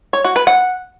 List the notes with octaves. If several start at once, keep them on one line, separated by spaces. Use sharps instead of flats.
C#5
F#4
B4
F#5